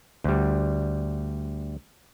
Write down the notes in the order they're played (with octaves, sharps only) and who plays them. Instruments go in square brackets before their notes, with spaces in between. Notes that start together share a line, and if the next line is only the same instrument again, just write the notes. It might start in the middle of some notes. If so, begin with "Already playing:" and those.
[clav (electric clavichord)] D2 G3